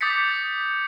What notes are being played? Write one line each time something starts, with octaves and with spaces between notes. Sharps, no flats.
D6 D#6 G6 A6 B6 C#7